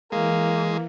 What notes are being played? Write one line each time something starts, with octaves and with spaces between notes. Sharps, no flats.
E3 G#3 A#3